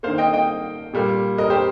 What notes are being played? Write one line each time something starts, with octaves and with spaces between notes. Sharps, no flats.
D#3 A#3 C5 F5
D#5 G5
D#5 G5
A#2 G3 A#3
A#4 D#5
G4 C5